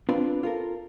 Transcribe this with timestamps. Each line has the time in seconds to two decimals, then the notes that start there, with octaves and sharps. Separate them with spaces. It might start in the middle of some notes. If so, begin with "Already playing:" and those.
0.09 C4 D4 F4 B4
0.43 F4 A4 A#4